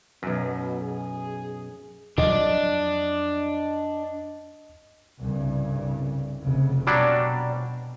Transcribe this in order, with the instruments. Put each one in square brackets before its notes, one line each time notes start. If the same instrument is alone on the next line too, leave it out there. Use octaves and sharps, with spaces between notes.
[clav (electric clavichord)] B1 F#2 [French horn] B2
[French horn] G#4
[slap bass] F2 F#3 G3 [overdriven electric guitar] D4 [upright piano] D#5
[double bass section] C2 G2 C#3
F1 C#3
[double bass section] B2 [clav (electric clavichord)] F#3 G3 D4